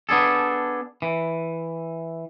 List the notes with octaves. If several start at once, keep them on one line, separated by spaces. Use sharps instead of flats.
B3 D4 G#4 A4
E3